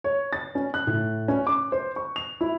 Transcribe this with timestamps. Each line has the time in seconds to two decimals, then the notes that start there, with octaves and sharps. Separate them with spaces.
0.04 C#5
0.33 A6
0.55 C#4
0.74 F#6
0.87 A2
1.28 C#4
1.47 D6
1.72 C5
1.96 C#6
2.16 F7
2.41 E4